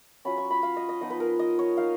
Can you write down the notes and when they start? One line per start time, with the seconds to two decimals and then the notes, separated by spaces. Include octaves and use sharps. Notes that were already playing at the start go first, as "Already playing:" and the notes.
0.25 F#3 C#4 F4 B5
0.38 C#6
0.50 B5
0.63 F5
0.76 D#5
0.89 D#5
1.01 F3 B3 D#4 D#5
1.10 B4
1.20 A#4
1.39 D#5
1.59 C#5
1.77 A#3 D#4 F5